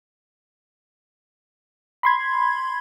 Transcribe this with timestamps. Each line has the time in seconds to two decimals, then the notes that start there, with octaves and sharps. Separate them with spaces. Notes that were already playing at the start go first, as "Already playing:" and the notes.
2.03 B5 C6 G#6